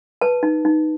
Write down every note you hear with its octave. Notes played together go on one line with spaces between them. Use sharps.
B4 A5
D#4
D#4